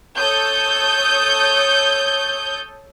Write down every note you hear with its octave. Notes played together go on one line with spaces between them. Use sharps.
A4 C#5 D#6 G6